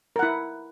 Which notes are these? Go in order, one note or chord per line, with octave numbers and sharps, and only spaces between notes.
E4 A#4 F#5